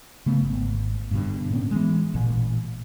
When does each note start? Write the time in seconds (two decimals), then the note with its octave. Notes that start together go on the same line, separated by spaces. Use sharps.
0.26 C#3 A3 B3
0.42 G#1
1.11 G2 B2 D3
1.51 A2 B3 C#4
1.71 E3 G#3
2.14 A1 A#2